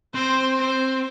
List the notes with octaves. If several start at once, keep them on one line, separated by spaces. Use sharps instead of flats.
C4 C5
C5